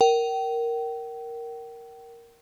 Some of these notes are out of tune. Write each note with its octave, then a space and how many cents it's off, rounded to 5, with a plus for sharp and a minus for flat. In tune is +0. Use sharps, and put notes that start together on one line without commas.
A#4 +0 G5 -35